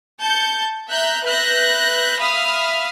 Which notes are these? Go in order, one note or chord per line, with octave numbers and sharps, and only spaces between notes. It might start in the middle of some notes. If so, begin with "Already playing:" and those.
A5 G6 C#7
E5 A#5 F#6 G6
B4 E5 F#6 G6 A#6
E5 F5 B5 D#6 F6